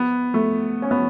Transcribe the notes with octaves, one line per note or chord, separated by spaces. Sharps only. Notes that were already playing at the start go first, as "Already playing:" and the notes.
Already playing: B3
A3
C#4
B3